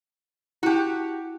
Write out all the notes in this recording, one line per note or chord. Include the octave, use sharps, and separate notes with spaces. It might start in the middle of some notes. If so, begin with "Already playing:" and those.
E4 F#4 G4 A5